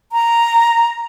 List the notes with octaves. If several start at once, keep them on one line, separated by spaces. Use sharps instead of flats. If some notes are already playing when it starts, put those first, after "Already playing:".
A#5